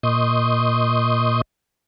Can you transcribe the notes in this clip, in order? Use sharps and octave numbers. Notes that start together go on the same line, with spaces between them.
A#2 D#5 C6 C#6 D#6 G6